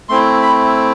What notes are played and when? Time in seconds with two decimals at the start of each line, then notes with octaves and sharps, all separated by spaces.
0.09 A3 C4 E4 C6
0.42 B5